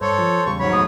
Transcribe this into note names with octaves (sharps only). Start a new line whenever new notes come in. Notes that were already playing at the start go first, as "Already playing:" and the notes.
G2 A4 C5 C#5
F3
E2 C#3 G3 C#6
G#2 F#3 C#5 B5
D#1 E2 A3 D#6